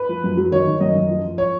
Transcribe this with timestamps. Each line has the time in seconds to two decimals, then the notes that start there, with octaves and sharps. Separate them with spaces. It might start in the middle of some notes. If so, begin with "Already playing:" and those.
Already playing: B4
0.09 F3
0.24 F#2
0.37 F#3
0.51 D#3 C#5
0.66 D#3
0.80 F#2 D#5
0.95 F#2
1.10 F3
1.25 F3
1.38 C#5